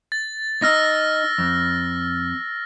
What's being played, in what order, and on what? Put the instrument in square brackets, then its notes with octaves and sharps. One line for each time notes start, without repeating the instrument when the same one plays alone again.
[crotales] A6
[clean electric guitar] D#4 [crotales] E6 F6 A#6
[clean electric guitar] F2